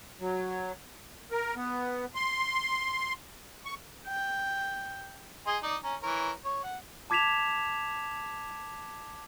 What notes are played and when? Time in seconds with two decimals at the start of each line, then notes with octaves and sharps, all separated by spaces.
0.20 F#3
1.31 A#4
1.56 B3
2.15 C6
3.65 C#6
4.07 G5
5.47 G#4 D#5 C6
5.63 D#4 D5
5.83 C#4 A#5
6.02 E3 A#4 C#5
6.45 C#5
6.64 F#5
7.10 A5 D6 G#6 B6 E7 F7